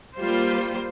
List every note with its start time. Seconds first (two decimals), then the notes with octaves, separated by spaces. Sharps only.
0.16 G3 A#3 F4 C5